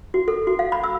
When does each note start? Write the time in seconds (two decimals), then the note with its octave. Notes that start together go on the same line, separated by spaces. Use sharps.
0.14 F#4
0.28 A4
0.47 F#4
0.59 F5
0.72 B5
0.84 E6